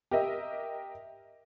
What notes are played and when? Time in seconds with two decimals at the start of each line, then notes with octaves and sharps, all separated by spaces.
0.11 G4 A#4 D#5 E5